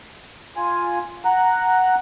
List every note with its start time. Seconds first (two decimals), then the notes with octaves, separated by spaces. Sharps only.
0.57 F4 G#5
1.25 F#5 A#5 F#6